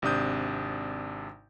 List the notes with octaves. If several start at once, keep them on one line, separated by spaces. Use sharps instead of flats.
G#1 C3 D4 D#6 G6